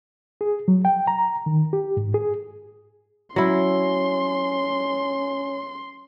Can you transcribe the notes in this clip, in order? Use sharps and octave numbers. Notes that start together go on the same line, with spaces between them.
G#4
F#3
G5
A#5
D#3
G4
G#2
G#4
F#3 C#4 E4 C6